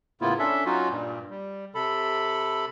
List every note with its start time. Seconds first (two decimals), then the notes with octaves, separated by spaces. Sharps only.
0.21 A2 C#3 A#3 B3 E4 F4
0.39 C#4 D4 A4 E5
0.65 F#3 C#4 D#4 F4 F#4
0.89 G2 A#2 G3
1.30 G3
1.75 C3 A4 B5